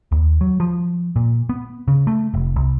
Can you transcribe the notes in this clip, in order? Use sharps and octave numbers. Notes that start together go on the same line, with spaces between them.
D#2
F#3
F3
A#2
B3
C#3
A3
F1
C2